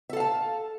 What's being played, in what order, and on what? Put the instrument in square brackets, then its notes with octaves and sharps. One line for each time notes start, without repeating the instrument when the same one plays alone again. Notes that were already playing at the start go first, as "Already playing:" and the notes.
[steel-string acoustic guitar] E5
A4
F5
A5